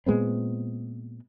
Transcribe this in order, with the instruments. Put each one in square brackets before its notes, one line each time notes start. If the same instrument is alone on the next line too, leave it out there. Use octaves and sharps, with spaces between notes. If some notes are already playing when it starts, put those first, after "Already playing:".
[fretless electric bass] A#2 G#3 B3 C4